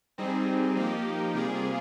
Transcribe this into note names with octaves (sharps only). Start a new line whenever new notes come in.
G3 C4 D#4 G#4
F3 A#3 D#4 G4
C3 G3 A#3 F4 G#4